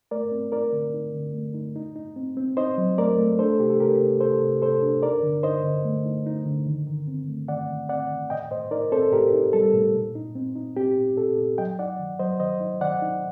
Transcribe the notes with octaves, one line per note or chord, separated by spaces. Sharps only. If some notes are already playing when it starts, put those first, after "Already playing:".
A3 A#4 D5
C4
D#4 A#4 D5
D3
D#4
D3
A3
D#4
D#4
D#4
C4
C4
D#4 C5 D#5
F#3
A3 A#4 D5
A3
D4 A4 C5
C3 G4
A4
C3 G4 A#4
C3
C3 A4 C5
C3
C3 A4 C5
D4
D#4 A#4 D5
D3
D#4 C5 D#5
D3
A3
D#4
D#4
D3
D#3
D#3
C4
A3
D#3 D5 F#5
D#3
C4 D5 F#5
D#3
A2 D#5 G5
A2 C5 D#5
D#4 A#4 D5
C4 A4 C5
A2 G4 A#4
D#4
G3 A4
A2
A#2
D#4
C4
D#4
C4 G4
A#2
A#2 A4
A#2
F#3 D#5 G5
D#4 D5 F#5
D#3
F#3 C5 D#5
D#3 C5 D#5
D#4
D#3 D5 F#5
D#4